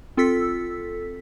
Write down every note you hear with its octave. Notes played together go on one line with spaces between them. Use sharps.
C4 F4 A4 E6 B6